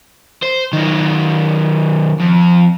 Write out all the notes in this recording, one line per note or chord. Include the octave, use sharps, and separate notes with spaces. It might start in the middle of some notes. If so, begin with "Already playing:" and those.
C5
D#3 F#3
F2